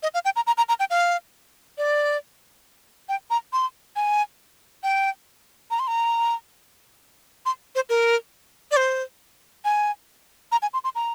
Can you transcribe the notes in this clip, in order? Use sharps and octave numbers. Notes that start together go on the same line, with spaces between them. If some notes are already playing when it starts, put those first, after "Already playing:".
D#5
F5
G5
A#5
A#5
A#5
A#5
G5
F5
D5
G5
A#5
C6
G#5
G5
A#5
C6
A#5
C6
C5
A#4
D5
C5
G#5
A#5
G#5
C6
C6
A#5